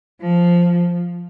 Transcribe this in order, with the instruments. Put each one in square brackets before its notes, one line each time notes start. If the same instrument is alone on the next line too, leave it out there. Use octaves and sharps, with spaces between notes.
[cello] F3